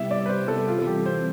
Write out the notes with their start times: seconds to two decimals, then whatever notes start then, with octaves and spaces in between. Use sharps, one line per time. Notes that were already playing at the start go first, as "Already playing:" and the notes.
Already playing: C3 G3 B3 E4 G4 E5
0.11 D5
0.26 B4
0.29 C5
0.48 A4
0.67 C3 E3 G3 C4 F4
0.79 A4
0.87 G4
1.06 C5